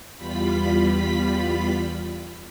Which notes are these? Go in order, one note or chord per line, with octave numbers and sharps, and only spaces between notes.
E2 G3 F4 B5 B6